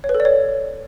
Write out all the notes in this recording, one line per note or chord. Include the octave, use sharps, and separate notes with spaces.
C#5
B4
A4
D5
C#5